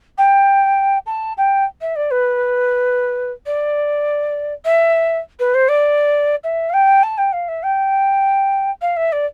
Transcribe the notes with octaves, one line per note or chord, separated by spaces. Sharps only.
G5
A5
G5
E5
D5
B4
D5
E5
B4
C5
D5
E5
F5
G5
A5
G5
F5
E5
G5
F5
E5
D5